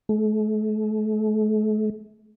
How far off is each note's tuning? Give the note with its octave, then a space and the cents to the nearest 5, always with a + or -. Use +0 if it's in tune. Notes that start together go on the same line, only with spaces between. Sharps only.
A3 -40